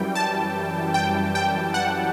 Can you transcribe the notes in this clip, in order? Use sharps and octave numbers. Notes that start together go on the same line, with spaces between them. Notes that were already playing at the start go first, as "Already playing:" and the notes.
Already playing: F#2 E3 G3 G5
A5
G5
G5
F#5